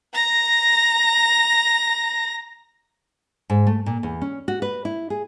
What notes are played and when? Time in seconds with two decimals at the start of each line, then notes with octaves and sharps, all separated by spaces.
0.14 A#5 A#6
3.50 G#2
3.67 A3
3.86 A#2
4.03 E2
4.22 C#4
4.48 F#4
4.62 B4
4.85 E4
5.10 G#4